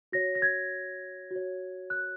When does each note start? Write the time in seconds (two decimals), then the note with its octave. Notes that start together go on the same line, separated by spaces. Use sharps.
0.12 F#4 C#5 A#6
0.35 A#6
0.42 G#6
1.31 F#4 C#5
1.90 F#6